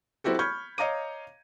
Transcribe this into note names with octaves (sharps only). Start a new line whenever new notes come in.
F#3 C4 E4 F#4 G4 A4
B5 C#6 F6 G6 G#6
C#5 D#5 F5 A#5 D6 D#7